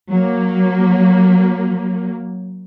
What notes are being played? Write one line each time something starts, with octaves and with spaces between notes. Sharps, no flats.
F#3 A#3